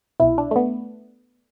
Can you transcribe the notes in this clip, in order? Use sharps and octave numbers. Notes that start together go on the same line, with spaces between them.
C2 B2 E4
D4
A3
B3